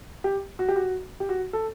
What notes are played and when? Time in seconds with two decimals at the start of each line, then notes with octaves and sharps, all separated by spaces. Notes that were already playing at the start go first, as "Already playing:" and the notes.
0.24 G4
0.59 F#4
0.68 G4
0.76 F#4
1.20 G4
1.29 F#4
1.53 A4